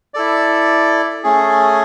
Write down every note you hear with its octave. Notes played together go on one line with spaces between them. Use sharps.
E4 A4 D5
A3 C#4 G#4